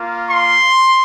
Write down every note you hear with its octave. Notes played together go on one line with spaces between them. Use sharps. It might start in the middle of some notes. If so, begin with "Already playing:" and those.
Already playing: A#3 F4
C6